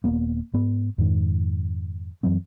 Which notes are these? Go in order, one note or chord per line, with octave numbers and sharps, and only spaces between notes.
D#1 A#3 B3
G#2 B3
F2 G#2 D#3
F#2 E3 F#3 C4